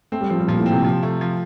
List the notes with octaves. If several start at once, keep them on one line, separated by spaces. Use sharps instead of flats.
A3 C4
G3
F3 C4
G3
A#2 F3
A2
C4
C3
F3
A3
F3